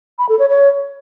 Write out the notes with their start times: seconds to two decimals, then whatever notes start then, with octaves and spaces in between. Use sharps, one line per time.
0.18 B5
0.29 A4
0.39 C#5
0.49 C#5